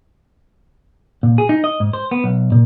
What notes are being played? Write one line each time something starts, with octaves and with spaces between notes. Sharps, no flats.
A#2
G#4
D#4
D#5
G#2
C5
B3
B1
A#2